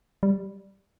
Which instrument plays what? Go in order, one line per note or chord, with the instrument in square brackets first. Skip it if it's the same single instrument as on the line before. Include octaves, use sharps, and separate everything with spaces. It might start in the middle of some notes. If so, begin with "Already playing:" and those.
[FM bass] G3